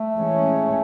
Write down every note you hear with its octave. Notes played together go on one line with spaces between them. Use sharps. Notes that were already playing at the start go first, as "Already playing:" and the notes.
Already playing: A3
E3 G#3 C#4